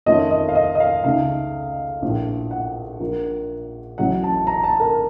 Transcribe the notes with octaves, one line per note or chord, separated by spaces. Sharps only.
F2 D#3 A3 C#4 F4 D#5
D#5
F5
D#5
D#5
F5
C#2 C#3 A3 D#4 F5
A#1 A2 F3
F#5
A#1 A#2 F3 A#3
A1 A2 F#3 A3 C#4 F#5
A5
A#5
A5
A#4